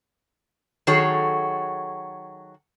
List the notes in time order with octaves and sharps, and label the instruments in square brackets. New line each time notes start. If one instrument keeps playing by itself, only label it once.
[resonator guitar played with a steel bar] D#3 F#3 F#4 G#4 A4 C#5